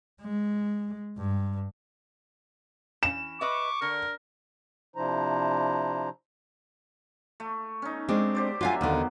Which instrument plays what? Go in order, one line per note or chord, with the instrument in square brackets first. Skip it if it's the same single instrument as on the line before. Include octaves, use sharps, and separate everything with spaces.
[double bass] G#3
G2
[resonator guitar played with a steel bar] E3 C#4 [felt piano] E7
[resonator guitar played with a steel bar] B4 D#5 E5 [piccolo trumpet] C#6 [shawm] D6
[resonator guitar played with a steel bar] D3 [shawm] A#4
[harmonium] C3 F3 D4 E4 C5 A#5
[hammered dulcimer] A3
C#4 D#4
[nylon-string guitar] G#3 C4 D4 [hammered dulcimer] D6
[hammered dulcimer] G4 C5 D5
[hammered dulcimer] D3 F#3 E5 [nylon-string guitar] F4 F5 G#5
[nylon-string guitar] D#2 D3 [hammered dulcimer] D#3 A#3 B3